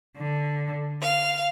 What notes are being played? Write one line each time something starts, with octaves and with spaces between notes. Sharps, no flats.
D3
F5